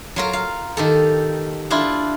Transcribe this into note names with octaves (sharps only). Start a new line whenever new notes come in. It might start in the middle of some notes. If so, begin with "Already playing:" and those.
F#3 F4 A#4
F5
D#3 G4 A4
D4 E4 F4